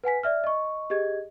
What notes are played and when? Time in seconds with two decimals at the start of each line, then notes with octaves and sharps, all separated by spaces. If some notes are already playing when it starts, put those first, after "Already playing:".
0.04 B4 F#5 G#5 B6
0.23 D5 E5 F6
0.44 D#5 C#6
0.90 G4 G#4 D#5 G#6